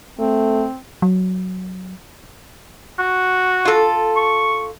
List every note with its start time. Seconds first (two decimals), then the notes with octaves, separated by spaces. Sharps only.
0.19 A3 C4
1.02 F#3
2.99 F#4
3.65 F4 A4
4.17 C#6